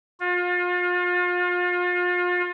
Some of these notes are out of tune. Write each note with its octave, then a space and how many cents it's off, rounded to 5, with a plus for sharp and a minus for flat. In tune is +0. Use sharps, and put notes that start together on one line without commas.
F4 +35